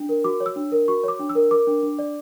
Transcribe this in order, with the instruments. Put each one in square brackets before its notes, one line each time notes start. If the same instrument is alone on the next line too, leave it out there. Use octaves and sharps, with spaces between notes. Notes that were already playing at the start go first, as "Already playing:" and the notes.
Already playing: [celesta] D4
A#4
F#4 D6
C#5
E6
D4
A#4
F#4 C#6
C#5 D6
D4
E6
A#4
A#4 D6
D4
D4
D5